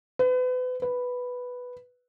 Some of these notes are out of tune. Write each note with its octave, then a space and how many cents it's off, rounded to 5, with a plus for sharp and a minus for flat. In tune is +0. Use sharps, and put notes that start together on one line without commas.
B4 +35
B4 +0